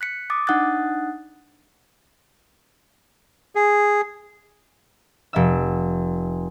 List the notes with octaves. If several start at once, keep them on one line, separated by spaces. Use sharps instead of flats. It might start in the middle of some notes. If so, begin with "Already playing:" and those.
F#6 B6 C#7
D6 D#6 A6
D4 D#4 F#5 D#6 F#6 A6
G#4
F1 E5 E6